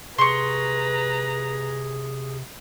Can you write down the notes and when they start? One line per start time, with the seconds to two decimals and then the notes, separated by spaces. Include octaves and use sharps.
0.18 C3 G#4 B4 A#5 C6 C#6